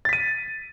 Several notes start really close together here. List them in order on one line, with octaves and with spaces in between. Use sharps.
A6 B6 D#7